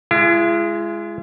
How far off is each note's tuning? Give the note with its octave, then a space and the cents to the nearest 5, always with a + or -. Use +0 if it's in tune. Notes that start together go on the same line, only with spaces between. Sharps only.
G#3 +0 E4 +45